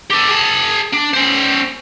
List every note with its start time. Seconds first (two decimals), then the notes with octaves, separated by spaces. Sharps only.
0.11 G4 A4
0.30 G#4 A5
0.94 D4
1.14 C#4 C5